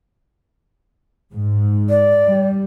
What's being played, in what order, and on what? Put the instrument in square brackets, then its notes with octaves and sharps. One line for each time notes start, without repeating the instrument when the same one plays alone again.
[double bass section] G#2
[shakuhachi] D5
[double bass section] G3